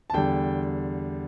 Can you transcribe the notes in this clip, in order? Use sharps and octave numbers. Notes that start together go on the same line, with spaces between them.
A5
E2 D3 G3 G5